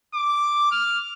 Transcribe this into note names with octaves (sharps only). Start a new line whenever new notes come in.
D6
F6